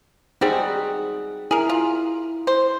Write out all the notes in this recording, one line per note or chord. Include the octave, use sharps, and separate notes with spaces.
G3 C4 D#4 F#4 G#4
E4 G#4 A#4
F4
C5